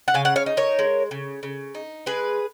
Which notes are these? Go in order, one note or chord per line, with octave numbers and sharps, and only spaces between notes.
F#5
C#3 F5 G#5
F#5
C#5 F5
D#4
A#4 C#5
G#3
C#3
C#3
D#4
G#3 G#4 B4